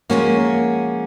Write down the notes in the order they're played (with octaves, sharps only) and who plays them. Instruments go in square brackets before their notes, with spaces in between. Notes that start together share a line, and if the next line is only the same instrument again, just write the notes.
[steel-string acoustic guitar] F3 G#3 C#4 F#4 [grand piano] A#3
[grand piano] A#3